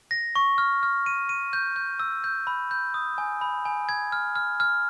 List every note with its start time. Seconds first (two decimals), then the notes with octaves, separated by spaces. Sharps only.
0.11 A#6
0.36 C#6
0.58 F6
0.83 F6
1.06 D#7
1.29 D#7
1.53 G6
1.76 G6
2.00 E6
2.24 G6
2.47 B5
2.71 G6
2.94 D#6
3.18 G#5
3.41 B5
3.65 G#5
3.89 G#6
4.12 F6
4.35 F6
4.60 F6